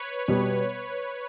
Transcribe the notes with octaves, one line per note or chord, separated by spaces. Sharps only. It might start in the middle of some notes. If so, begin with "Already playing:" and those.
Already playing: B4 C#5
B2 G3 B3